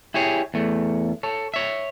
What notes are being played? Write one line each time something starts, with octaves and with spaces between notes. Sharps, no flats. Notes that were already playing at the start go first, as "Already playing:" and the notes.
E4 G4 G#4 C#5
E2 A3
A4 C#5
C#5 E5